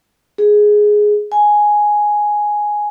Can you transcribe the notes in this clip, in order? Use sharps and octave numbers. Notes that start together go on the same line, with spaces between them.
G#4
G#5